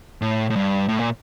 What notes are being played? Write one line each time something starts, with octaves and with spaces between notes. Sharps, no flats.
A2
A2
G2
A2
A#2